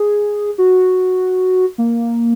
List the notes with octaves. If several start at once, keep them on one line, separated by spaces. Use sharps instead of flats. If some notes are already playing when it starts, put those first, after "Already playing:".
Already playing: G#4
F#4
A#3